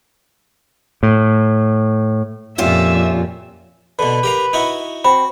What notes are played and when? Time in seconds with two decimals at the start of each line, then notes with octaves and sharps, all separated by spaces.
1.03 A2
2.58 F2 A#2 C#4 F4 G4 E5
3.99 B2 D3 B4
4.23 G4 A#4 F5
4.53 D#4 E4 F#4
5.05 C4 F#4 B5